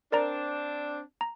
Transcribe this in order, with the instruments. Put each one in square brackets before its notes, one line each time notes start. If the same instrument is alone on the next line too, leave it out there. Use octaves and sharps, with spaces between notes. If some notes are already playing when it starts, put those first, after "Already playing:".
[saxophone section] C4 D4 [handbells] A#4 D5 A#5
[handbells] A#5